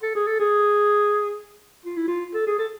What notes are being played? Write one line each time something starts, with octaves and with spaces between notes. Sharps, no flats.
A4
G#4
A4
G#4
F4
E4
F4
A4
G#4
A4